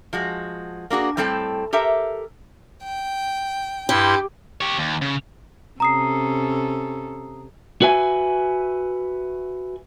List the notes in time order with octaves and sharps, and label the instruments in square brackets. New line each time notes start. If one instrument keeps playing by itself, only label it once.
[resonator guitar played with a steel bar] F3 G#3 F#4
A#3 D4 F#4 G#4
A2 G3 C4 A4 G5 A5
G4 A4 A#4 E5
[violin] G5
[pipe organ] G2 E4 C6 [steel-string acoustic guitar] G4
[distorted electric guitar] G4 C#5
D#2
C#3
[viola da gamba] C3 C#4 A4 [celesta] A#5 D#6 C7
[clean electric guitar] F#4 B4 E5 G#5